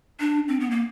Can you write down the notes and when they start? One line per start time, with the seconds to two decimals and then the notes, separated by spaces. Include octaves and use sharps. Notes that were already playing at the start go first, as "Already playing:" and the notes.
0.20 D4
0.48 C4
0.60 B3
0.70 A#3